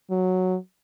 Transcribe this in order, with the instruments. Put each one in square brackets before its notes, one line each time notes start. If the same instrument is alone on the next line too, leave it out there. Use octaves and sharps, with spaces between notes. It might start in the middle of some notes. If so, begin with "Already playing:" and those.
[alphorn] F#3